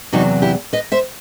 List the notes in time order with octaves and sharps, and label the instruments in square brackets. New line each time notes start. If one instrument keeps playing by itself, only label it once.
[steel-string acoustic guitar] E2 C3 F#3 D#4 F#4
E4 G4
B4 D#5
C5 E5